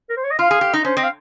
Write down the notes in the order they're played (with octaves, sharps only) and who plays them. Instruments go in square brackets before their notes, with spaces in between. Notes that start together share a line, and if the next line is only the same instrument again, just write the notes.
[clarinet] A#4
C5
C#5
D#5
[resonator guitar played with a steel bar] F4 [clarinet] F5
[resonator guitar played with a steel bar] G#4
G4
[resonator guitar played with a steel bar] D#4 [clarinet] D#5
[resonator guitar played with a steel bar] C#4 [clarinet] C5
[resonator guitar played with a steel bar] C4 [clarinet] D#5
[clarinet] F5